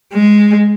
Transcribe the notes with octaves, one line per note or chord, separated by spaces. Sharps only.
G#3